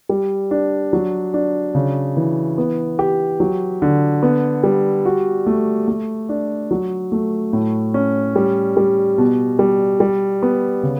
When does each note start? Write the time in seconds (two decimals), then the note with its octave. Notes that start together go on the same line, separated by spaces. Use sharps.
0.09 G3
0.51 D4
0.93 F#3
1.34 D4
1.75 C#3
2.17 E3
2.58 B3
2.99 G4
3.40 F#3
3.82 D3
4.23 B3
4.64 G3
5.05 F#4
5.47 A3
5.88 A3
6.29 D4
6.71 F#3
7.12 A3
7.53 A2
7.94 C#4
8.36 G3
8.77 G3
9.18 B2
9.59 G3
10.00 G3
10.42 B3
10.83 C#3